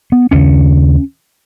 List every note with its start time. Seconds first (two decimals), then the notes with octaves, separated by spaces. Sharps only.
0.12 B3
0.31 D#2 C#3 C#4